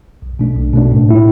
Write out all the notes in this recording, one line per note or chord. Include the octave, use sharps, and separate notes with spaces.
B1
B2 A3 D4
B1
B2 A3 D4
A2
A3 E4